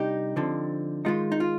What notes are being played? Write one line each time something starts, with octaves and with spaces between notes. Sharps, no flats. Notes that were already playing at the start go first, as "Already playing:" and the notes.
Already playing: C3 G3 D4 D#4 G4
D3 F3 C4
D#3 G#3 D#4 F4
D#4
F4